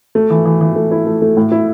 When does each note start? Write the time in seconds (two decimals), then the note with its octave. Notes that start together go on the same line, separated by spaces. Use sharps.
0.15 A3
0.30 E3
0.45 E3
0.61 E3
0.76 A3
0.91 E4
1.06 A3
1.22 A3
1.37 A2
1.52 E4